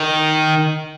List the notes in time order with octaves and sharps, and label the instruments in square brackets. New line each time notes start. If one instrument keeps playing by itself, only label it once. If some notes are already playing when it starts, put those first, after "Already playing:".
Already playing: [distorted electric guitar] D#3